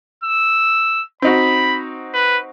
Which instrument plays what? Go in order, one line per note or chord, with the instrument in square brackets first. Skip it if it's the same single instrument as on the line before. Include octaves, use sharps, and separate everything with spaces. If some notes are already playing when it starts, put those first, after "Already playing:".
[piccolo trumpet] E6
[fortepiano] C4 D#4 F#4 [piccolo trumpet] B5
[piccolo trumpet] B4